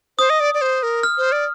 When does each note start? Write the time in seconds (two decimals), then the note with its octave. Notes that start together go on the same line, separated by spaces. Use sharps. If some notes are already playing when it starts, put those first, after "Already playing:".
0.19 C5 D#6
0.30 D#5
0.40 D5
0.54 D5
0.61 C5
0.83 A#4
1.03 F6
1.18 C5
1.32 D5